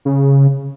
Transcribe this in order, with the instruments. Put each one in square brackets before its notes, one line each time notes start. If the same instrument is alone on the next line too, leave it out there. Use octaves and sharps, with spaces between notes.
[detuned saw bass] C#3